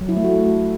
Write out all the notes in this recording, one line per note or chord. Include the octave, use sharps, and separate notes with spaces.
F#3
E4
A3
F#4